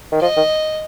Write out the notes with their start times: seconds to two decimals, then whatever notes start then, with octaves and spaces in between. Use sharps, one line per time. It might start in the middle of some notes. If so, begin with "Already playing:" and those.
0.12 D#3
0.21 F3 D#5
0.37 D#3